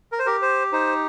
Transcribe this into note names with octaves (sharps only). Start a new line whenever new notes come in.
A#4
C5
G4 A#4
C5
D#4 C5